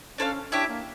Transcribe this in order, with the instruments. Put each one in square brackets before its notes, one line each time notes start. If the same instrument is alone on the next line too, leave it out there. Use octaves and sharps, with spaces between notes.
[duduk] C#4 [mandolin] D4 A4 C#5 F5
[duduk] D4 [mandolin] E4 G4 C#5 E5
[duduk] A#3